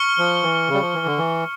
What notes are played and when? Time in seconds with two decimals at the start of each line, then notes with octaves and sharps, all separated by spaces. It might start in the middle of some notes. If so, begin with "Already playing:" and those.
Already playing: C#6 F6 C#7 G7
0.18 F3
0.43 E3
0.69 C#3
0.74 G3
0.81 F3
0.94 E3
1.06 D3
1.18 E3